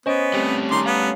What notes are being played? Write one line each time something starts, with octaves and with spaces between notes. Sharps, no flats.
B3 C#4 C5 D#5 D7
G3 A3 C4
D#3 A#5 C6 D6
B3 F5